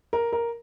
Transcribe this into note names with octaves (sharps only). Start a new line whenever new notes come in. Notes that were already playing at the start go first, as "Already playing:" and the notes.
A#4
A#4